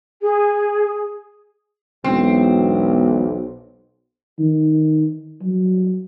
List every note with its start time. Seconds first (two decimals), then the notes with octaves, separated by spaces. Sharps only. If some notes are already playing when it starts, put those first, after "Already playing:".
0.21 G#4
2.04 E1 B1 C4
4.39 D#3
5.42 F#3